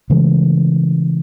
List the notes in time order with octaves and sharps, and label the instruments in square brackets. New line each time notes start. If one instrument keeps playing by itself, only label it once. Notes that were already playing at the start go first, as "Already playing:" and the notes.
[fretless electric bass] C#3 E3 G#3 A3